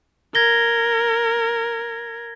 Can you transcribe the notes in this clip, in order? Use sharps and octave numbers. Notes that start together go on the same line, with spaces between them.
A#4 G#6 A#6 G7